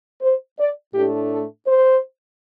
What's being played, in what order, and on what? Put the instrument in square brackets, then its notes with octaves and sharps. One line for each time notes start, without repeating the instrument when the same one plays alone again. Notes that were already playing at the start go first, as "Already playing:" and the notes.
[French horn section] C5
D5
A2 A3 D4 G4
A4
C5